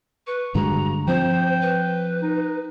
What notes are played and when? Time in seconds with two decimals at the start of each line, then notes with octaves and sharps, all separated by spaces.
0.27 B4 C#6
0.55 G2 D3 G#3 F#4 A#5
1.08 F3 C4 C5 G5
1.61 B4
2.22 D#4